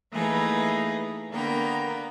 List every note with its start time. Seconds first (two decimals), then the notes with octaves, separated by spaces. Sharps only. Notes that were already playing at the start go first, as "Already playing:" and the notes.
0.12 E3 A3 A#3 D#4 G#4 B4
1.31 D3 A#3 B3 A#4 G5